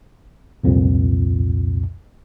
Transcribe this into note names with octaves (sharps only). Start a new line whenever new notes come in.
C2 F2 A#2